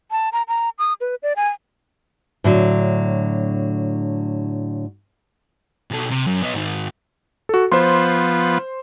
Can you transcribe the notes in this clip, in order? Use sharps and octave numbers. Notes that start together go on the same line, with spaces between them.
A5
A#5
A#5
D#6
B4
D5
G#5
A2 D3 F#3
B2 A4
C3
F#2
B3 D#4
G#2 D#3
F#4 A4
F3 B3 C5 C6